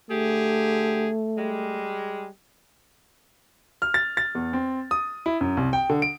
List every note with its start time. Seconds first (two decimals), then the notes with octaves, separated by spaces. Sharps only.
0.11 D3 A3 G4 G#4
1.38 G3 G#3
3.82 F6
3.94 A6
4.17 A6
4.35 E2
4.53 C4
4.91 D#6
5.26 E4
5.41 F#2
5.57 C2
5.73 G5
5.90 D3
6.02 D7